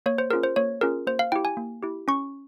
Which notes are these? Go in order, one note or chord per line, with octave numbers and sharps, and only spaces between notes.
A#3 C#5
C5
C#4 F4 G#4 A#4
C5
A#3 C#5
C#4 F4 G#4 A#4
A#3 C5
F5
E4 G4 G5
G#5
A#3
E4 G4
C#4 C#6